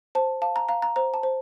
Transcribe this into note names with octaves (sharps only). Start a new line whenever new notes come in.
C5 A5
F5 A5
A#5
F5 A#5
A#5
C5 A#5
A5
C5